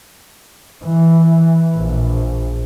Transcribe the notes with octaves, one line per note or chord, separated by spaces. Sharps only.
E3
A#1